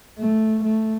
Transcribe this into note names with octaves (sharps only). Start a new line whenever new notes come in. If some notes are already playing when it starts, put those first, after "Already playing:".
A3
A3